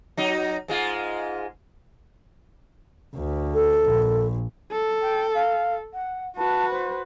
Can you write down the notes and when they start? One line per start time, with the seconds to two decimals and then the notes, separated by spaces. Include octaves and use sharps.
0.17 F#3 D#4
0.68 G#2 G#3 F4
3.16 D2
3.54 A4
3.85 A#1
4.72 A4
5.01 G5
5.34 F5
5.93 F#5
6.37 F#4 B4 A5
6.70 C5